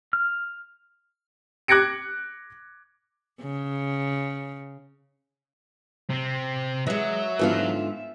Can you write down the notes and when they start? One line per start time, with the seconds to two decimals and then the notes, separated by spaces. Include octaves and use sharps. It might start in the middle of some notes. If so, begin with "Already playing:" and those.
0.13 F6
1.68 D6 F#6 G#6 A#6 C#7 D7
3.41 C#3
6.10 C3 C4
6.87 E3 F#3 G#3 E5
7.39 G#2 D3 E3 F3 B3 F4